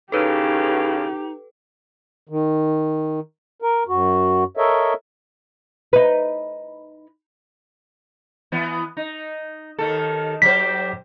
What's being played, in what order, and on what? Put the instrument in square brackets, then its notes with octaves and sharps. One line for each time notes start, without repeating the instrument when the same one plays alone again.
[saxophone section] A2 C#3 [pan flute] D#4 [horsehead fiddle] G4 [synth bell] A4 B4
[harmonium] D#3
A#4
F#2 F#4
A4 A#4 C#5 D#5 E5
[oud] D#4 B4
[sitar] E3 B3
D#4
D#2 D#3 A4
[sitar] F#3 G4 C5 [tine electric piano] B6